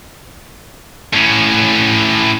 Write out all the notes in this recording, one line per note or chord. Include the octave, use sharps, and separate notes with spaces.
A2 C#4